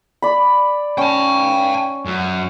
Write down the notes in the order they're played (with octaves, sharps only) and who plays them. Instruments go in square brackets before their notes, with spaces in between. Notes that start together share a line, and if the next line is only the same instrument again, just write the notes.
[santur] D5 B5
[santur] C#4 [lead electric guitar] G5 A5
[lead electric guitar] F#2